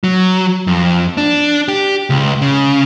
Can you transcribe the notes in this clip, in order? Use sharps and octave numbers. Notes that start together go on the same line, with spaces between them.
F#3
F2
D4
G4
C#2
C#3